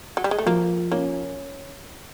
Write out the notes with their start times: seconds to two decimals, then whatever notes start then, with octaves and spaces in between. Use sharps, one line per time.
0.17 F#3
0.24 G3
0.31 G#3
0.39 A3
0.46 F3 A#3
0.92 A#3 C#4